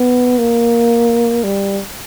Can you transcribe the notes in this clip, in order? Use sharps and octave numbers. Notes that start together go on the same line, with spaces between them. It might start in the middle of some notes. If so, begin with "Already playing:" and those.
Already playing: B3
A#3
G3